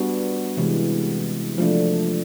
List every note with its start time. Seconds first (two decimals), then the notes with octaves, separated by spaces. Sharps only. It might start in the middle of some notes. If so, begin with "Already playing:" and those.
Already playing: G3 B3 D4 F#4
0.57 C3 E3 G#3
1.58 F3 A3 D4